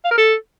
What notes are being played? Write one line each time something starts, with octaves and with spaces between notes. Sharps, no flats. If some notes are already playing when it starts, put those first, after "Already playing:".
F5
A#4
A4